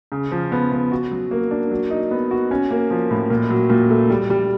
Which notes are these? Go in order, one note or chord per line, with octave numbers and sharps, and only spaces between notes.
C#3
F3
B3
B3
F#4
F#3
A#3
D4
F#3
D#4
B3
F#4
C#4
A#3
F3
A2
A#2
F#3
A#2
A3
G3
G3